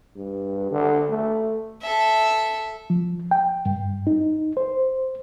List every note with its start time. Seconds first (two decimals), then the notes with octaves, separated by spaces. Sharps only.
0.16 G2
0.71 D3
1.09 A3
1.82 A4 E5
2.90 F3
3.31 G5
3.66 G2
4.07 D#4
4.57 C5